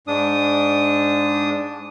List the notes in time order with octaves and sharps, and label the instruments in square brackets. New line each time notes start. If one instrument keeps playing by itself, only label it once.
[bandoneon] G#2 D4 D#6